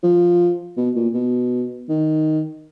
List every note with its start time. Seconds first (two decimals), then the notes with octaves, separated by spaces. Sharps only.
0.03 F3
0.77 B2
0.95 A#2
1.14 B2
1.89 D#3